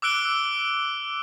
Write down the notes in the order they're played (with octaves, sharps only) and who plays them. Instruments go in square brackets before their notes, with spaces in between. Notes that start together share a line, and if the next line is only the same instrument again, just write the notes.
[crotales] D6 E6 F#6 D7 G7